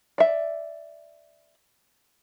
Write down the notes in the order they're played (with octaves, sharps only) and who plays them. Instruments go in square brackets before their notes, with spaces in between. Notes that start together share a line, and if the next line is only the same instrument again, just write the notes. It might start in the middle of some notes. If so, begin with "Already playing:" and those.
[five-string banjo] D5 E5